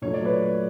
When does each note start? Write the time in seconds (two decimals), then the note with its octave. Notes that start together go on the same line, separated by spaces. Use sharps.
0.02 A#2 F#3 A3 C#5
0.14 D5
0.25 B4 C#5